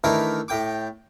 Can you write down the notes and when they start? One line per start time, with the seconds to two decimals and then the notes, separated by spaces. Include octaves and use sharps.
0.04 D#3 E3 A3 D4 E4 A#4
0.48 A2 G5 D6